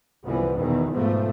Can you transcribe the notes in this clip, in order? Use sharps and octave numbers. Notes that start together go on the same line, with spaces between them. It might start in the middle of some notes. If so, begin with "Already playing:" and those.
C2 F#2 E3 F3 B3
E2 B2 D#3 E3
G#2 B2 F3 A3 B3